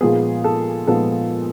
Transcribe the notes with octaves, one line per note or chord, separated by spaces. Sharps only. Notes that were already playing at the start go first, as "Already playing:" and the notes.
A#2 F3 G#3 B3 G#4
A4
A#2 F3 G#3 B3 A4